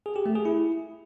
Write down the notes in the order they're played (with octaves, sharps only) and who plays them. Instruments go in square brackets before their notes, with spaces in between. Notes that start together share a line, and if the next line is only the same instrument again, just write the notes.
[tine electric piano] G#4
G4
A3
G#4
E4